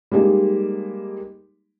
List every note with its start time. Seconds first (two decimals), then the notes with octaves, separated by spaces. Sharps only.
0.11 G3 G#3 A#3 D#4